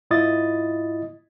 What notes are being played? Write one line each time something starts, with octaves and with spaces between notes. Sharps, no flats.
G#2 E4 F4 D#5 D#6 A6